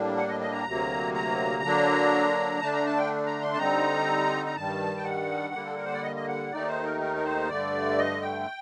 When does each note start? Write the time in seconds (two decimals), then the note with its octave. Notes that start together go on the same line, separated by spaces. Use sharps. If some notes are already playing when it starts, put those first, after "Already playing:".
Already playing: A2 G3 A#3 D4
0.17 F#5
0.28 D#5
0.41 D#5
0.52 A#5
0.65 D2 C3 F#3 A#3
1.14 A#5
1.63 D3 F#3 A#3 D4
2.61 D3 A3 D4 A5
2.73 A#5
2.86 A5
2.97 G5
3.26 A#5
3.42 C6
3.53 A5
3.58 D3 G3 C4 D#4 A#5
4.46 A#5
4.56 G2 D#3 G3 A5
4.97 G5
5.04 F#5
5.54 D3 G3 A#3
5.66 A4
5.76 A#4
5.85 C5
5.93 D5
6.03 D#5
6.16 D#5
6.27 F#5
6.52 D#2 D#3 A3 D#4 D5
6.67 C5
6.83 A#4
7.01 A#4
7.16 A#4
7.24 C5
7.49 G2 D3 A3 D5
7.98 D#5
8.22 G5